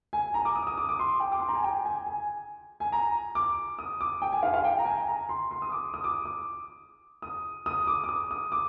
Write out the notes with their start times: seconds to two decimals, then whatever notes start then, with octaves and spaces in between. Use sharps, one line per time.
0.13 G#5
0.34 A#5
0.45 D6
0.56 D#6
0.67 D#6
0.77 D6
0.89 D6
0.99 C6
1.20 G5
1.32 D6
1.40 C6
1.48 A#5
1.55 G#5
1.63 G5
1.85 G#5
2.07 G#5
2.80 G#5
2.92 A#5
3.35 D6
3.79 D#6
4.01 D6
4.22 G5
4.32 G#5
4.43 F5
4.54 F5
4.64 G5
4.79 A#5
4.85 G#5
5.08 A#5
5.29 C6
5.51 C6
5.62 D#6
5.72 D6
5.94 D#6
6.04 D6
6.26 D6
7.22 D#6
7.66 D#6
7.87 D6
8.04 D6
8.09 D#6
8.31 D#6
8.52 D6